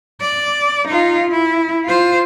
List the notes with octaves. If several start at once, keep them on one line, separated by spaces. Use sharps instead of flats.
D5
D#4 F4
E4
F4 C5